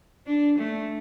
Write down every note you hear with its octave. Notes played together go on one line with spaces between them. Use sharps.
D4
A3